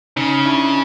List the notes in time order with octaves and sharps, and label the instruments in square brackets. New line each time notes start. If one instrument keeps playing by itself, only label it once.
[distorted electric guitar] C#3 [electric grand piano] C#4 D#4
[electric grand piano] D4 E4